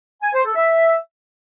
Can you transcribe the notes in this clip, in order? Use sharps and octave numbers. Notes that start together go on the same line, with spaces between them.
G#5
C5
A4
E5